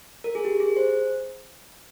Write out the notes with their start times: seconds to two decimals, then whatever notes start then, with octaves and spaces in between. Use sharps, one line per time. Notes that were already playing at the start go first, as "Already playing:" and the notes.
0.24 A#4
0.35 G#4
0.45 G4
0.60 G#4
0.77 C5